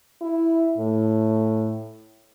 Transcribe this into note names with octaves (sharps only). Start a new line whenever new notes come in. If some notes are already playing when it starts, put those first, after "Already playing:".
E4
A2